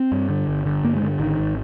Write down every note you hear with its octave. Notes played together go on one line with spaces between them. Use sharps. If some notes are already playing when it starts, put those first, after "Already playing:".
Already playing: C4
G2
D3
G1
D3
G2 A#3
G#3
D3
G#1 D#3
G#1